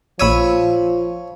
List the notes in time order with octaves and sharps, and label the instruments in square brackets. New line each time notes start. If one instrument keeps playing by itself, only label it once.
[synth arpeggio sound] A#1 E6 D#7 [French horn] F3 [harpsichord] C#5 B5